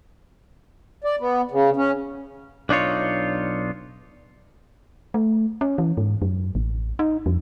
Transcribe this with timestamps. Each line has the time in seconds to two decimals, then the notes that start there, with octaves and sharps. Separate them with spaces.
1.04 D5
1.20 B3
1.51 C#3
1.76 C#4
2.69 B1 D4 D#4 F4 C#5
5.14 A3
5.61 C#4
5.78 E3
5.97 G#2
6.22 F#2
6.55 A1
6.99 D#4
7.26 F2